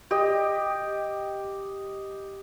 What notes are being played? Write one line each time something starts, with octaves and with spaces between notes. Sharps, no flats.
G4 D#5